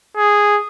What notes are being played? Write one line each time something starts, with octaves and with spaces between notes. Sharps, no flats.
G#4